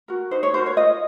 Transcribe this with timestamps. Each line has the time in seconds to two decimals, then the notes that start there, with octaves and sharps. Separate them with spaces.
0.08 F#4 A#4
0.31 D#4 C5
0.43 C#5
0.54 F#4 A#4 C5
0.66 C#5
0.77 F4 D#5